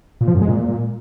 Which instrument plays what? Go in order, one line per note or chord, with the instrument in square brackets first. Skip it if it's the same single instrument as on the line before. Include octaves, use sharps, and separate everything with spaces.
[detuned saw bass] A#2
F3
F#2
G#3
A#2